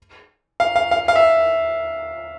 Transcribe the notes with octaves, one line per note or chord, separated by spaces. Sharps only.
F5
F5
F5
F5
E5